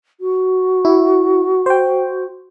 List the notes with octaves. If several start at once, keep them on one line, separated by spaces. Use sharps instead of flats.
F#4
E4
C5 G5